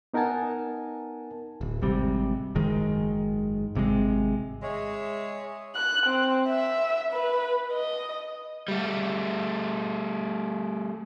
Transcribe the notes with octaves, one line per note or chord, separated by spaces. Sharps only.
B3 D#4 A#4 F#5 G#5 A5
D1
G#1 G#2 C3 G3
F#1 G#2 D#3 G#3
G#1 C3 F3 G#3
G#3 C#5 E5
F#6
C4
E5
B4
D#5
G3 A3